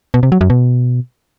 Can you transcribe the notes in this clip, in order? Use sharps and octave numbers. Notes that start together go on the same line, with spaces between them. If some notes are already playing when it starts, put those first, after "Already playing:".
B2
C3
F#3
F#2
B2